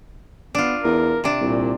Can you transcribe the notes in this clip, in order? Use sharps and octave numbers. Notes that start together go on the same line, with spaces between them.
B3 D4 F4
E2 A#4
C3 D4
C2 A#2